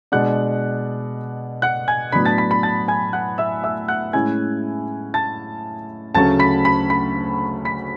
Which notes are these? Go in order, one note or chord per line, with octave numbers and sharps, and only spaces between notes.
B2 G#3 D4 F#5 F#6
F#5 F#6
G#5 G#6
A2 F#3 B3 D4 B5 B6
A5 A6
B5 B6
B5 B6
A5 A6
G#5 G#6
F#5 F#6
E5 E6
E5 E6
F#5 F#6
A2 G#3 C#4 E4 G#5 G#6
A5 A6
D2 C#3 F#3 A3 C#4 A5 A6
B5 B6
B5 B6
B5 B6
B5 B6